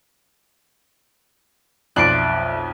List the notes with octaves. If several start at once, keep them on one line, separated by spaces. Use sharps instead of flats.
B1 F2 D5 E5 C6 F#6 C7 D7